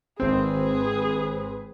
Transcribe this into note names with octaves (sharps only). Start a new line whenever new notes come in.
G#1 C4 G#4 B4